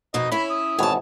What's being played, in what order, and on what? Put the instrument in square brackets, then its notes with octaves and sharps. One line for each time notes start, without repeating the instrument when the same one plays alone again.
[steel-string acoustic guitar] F2 B2 D#4 [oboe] D#5
[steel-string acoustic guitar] C#4 E4 [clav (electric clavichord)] C#5 [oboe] B5
[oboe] D#6
[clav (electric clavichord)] G#1 B2 E3 [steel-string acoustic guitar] C#5 A5